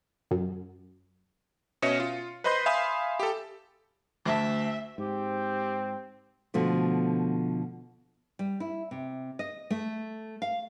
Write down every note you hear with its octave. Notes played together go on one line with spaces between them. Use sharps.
F#2
B2 C#4 C#5 D#5 E5 C#7
F4
B4 C5 D#5 B5 C6 G6
E5 F5 G#5 B5 C6 D#6
G4 A4
D2 E5 A5
G#2 C4 G4
B2 D3 F3 A3
G3
E4
C3
D#5
A3
F5